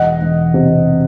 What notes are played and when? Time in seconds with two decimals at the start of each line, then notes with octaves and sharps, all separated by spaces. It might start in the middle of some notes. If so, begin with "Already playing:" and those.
Already playing: E1 D#5 F#5
0.21 E1
0.54 C3